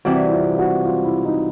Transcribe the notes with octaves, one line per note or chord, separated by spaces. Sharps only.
C3 E3 G3 F#4
E4
F4
F#4
F4
E4
D#4